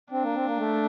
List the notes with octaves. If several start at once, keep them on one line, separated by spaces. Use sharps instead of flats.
C4 D4
A#3
C4
A#3
A3